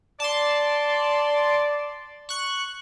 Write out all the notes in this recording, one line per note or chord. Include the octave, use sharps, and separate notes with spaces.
D5 A5 C6
C#6 F#6